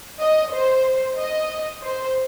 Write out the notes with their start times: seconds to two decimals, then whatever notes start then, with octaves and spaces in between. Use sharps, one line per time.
0.20 D#5
0.53 C5
1.18 D#5
1.83 C5